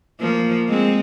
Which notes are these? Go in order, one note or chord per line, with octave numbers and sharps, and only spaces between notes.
F3 A#3
G#3 C4